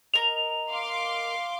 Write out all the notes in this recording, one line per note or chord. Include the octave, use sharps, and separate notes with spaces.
A#4 D#5 F7
F5 C6 D6